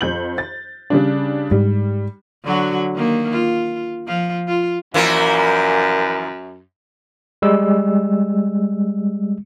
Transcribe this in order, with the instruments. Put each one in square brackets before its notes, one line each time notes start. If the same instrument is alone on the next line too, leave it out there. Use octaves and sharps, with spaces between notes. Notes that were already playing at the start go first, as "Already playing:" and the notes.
[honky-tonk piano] F2 G6 F#7
A6
C#3 G3 D4
[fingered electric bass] G#2 [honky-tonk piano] G3
[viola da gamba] D3 F#3 F#4
D#3 A#3
F4
F3 F4
F4
[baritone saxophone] F#2 [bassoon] A#2 [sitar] E3 F3 A#3
[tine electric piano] G3 G#3 E6